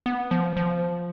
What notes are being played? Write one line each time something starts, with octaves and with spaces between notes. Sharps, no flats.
B3
F3
F3